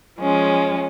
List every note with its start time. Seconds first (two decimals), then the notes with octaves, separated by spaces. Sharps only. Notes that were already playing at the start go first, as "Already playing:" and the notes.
0.19 F3 G#3 C#4